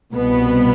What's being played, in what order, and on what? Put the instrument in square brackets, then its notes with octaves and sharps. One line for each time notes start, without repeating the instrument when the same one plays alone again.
[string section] C2 B2 B3